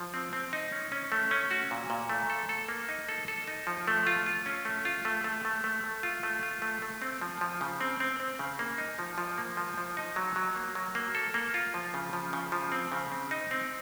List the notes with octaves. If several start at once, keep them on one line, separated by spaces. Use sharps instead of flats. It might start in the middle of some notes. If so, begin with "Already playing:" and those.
Already playing: F3
C4
C4
D#4
C#4
C#4
A3
C#4
F#4
A#2
A#2
A3
A4
A4
A#3
D#4
A4
A4
D#4
F3
A3
F4
F4
C#4
A3
F4
A3
A3
A3
A3
A3
F4
A3
F4
A3
A3
C4
F3
F3
C#3
C4
C4
C4
C#3
A#3
D#4
F3
F3
A#3
F3
F3
D#4
F#3
F#3
A#3
F#3
A#3
A4
A#3
F4
F3
C#3
F3
C#3
F3
C4
C#3
C4
D#4
C4